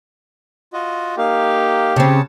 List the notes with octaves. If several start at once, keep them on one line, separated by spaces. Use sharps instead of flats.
F4 F#4 D#5
A#3 D#4 G4 F5
C#3 C4 C#5 A5